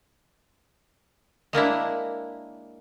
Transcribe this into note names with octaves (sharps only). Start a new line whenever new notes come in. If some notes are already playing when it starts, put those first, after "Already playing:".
G#3 A#3 D4 E4